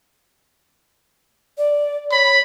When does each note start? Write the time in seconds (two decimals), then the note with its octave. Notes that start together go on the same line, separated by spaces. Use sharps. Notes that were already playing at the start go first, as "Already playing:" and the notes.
1.58 D5
2.11 C#5 B5